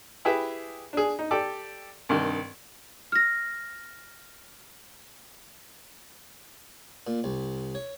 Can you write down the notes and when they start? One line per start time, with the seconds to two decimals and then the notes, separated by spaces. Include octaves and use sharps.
0.25 E4 G4 G#4 B4 E5
0.93 D4 G#4
1.19 D#4
1.31 G4 A4 D5 D6
2.09 C2 G2 D#3
3.12 F6 A#6
7.07 A#2
7.24 C2
7.75 C#5